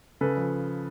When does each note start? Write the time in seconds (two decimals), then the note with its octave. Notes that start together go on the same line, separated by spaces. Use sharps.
0.21 C#3 A4 B4
0.37 F3